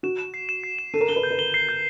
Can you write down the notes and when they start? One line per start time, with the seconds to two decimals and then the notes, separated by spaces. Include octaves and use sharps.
0.03 F#4 E7
0.19 E7
0.34 C7
0.49 E7
0.64 C7
0.79 E7
0.94 A4 D#7
1.01 A#4
1.09 A4 G7
1.16 B4
1.23 G6
1.30 B4
1.38 A#4 G7
1.54 C7
1.69 G6